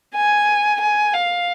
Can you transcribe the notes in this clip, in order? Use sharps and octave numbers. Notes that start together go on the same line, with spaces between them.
G#5
G#5
F5